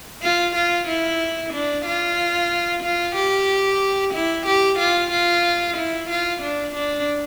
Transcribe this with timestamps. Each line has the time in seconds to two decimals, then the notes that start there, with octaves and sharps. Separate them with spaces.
0.22 F4
0.55 F4
0.87 E4
1.53 D4
1.85 F4
2.83 F4
3.16 G4
4.14 E4
4.46 G4
4.78 F4
5.11 F4
5.77 E4
6.09 F4
6.42 D4
6.75 D4